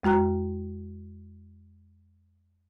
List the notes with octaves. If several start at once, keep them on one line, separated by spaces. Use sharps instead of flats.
F2 G#3 F#4 A#5 F#6